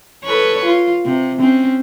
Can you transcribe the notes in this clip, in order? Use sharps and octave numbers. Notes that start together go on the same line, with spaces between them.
A4 B4 C#5
F4
C3
C4 C#4